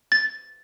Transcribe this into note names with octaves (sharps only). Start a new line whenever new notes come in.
A6